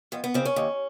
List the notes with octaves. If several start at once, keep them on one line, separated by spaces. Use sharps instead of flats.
F2 B3
B3
C#3 E3 C4
C#4
D#2